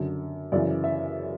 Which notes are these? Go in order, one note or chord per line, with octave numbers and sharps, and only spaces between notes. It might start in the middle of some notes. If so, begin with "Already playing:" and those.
Already playing: F#2 D3
F#2 C#3 E3 D5
E5